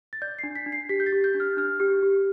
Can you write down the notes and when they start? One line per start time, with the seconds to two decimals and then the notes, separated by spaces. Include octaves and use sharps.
0.13 A6
0.22 D5 G6
0.39 D4 C7
0.55 B6
0.66 D4
0.72 C7
0.89 G4 B6
1.00 G6
1.06 A6
1.12 G4
1.24 G6
1.35 D4
1.40 F6
1.57 D4 F6
1.80 G4
2.03 G4